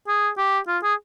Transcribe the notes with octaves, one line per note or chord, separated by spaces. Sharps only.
G#4
G4
F4
G#4